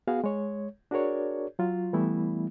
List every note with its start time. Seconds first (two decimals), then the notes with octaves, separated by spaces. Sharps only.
0.07 B3 F#4 G#4 F5
0.24 G#3 C#5
0.91 D4 F#4 G#4 A#4 C#5 D5
1.59 F#3 F4
1.93 E3 G3 A3 B3 E4